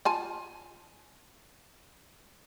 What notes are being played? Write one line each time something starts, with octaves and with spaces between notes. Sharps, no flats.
F4 G#5 A5